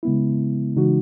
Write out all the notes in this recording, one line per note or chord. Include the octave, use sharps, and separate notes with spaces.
C#3 G#3 B3 E4
C#3 E3 G#3 D#4 F#4